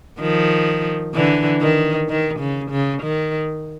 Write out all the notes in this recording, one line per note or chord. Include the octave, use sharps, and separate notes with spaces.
D#3 F3
D3 E3
D#3
D#3
C#3
C#3
D#3